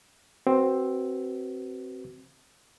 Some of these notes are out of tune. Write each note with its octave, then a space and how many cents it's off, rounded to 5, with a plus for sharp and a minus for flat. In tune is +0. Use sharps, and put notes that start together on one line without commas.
C4 +10 F#4 +30 B4 -5